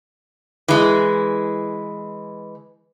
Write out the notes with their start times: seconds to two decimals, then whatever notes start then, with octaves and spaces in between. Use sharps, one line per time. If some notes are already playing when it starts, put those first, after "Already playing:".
0.68 E3 G#3